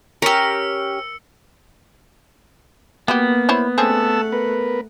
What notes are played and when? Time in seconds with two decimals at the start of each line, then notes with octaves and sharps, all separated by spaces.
0.22 C#4 G4 A#4 E6 C#7
3.08 G3 A#3 B3 F#4 G4
3.49 E4 C5 C#5
3.78 C#3 A3 C4 G#4 F#5 A5 E6
4.32 B3 A#4 B4